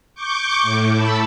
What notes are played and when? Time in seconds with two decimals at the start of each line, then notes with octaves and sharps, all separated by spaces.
0.15 C#6 D6 G6
0.63 A2
0.94 A5 B5 E6